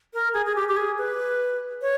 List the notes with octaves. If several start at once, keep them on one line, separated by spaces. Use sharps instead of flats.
A#4
G#4
G#4
G4
G4
G#4
B4
C#5